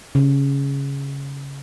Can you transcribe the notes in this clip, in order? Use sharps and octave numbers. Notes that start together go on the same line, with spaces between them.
C#3